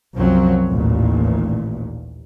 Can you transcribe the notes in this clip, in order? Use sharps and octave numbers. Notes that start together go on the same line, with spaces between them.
C2 F#2 F3 F#3 C4
A1 D#2 A#2